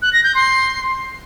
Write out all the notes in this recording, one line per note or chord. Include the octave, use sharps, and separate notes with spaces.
F#6
A#6
G6
C6